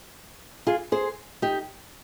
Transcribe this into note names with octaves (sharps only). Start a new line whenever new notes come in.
F4 G#4
G#4 C5
D#4 G4